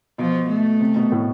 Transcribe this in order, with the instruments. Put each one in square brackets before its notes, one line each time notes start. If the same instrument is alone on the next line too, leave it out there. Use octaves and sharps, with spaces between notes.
[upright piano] B2 [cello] F3
[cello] A3
[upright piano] C3
B2
A2